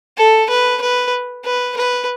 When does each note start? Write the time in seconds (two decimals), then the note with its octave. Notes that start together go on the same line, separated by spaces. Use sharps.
0.17 A4
0.49 B4
0.81 B4
1.45 B4
1.77 B4